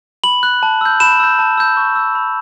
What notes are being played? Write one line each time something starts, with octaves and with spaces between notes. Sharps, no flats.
B5 F#7
F#6
A5
E6 G6
B5 E7
E6 G6
A5
E6 G6
C#6
E6 G6
B5